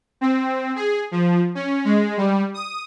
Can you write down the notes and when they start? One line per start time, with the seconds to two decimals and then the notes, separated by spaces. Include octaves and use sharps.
0.21 C4
0.76 G#4
1.11 F3
1.55 C#4
1.85 G#3
2.17 G3
2.54 D#6